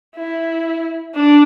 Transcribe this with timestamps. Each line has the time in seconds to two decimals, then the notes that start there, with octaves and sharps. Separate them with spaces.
0.15 E4
1.15 D4